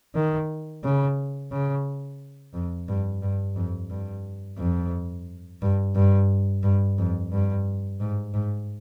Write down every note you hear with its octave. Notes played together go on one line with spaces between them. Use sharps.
D#3
C#3
C#3
F2
G2
G2
F2
G2
F2
G2
G2
G2
F2
G2
G#2
G#2